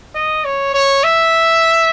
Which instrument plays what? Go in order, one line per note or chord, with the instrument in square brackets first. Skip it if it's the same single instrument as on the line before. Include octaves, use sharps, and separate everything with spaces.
[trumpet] D#5
C#5
C#5
E5